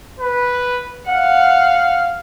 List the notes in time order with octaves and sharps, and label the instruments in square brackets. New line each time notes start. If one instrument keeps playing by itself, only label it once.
[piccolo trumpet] B4
[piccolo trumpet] F5 [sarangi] F#5